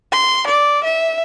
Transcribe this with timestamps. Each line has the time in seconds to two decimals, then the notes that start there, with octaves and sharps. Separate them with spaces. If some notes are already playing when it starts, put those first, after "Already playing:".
0.12 C6
0.47 D5
0.84 E5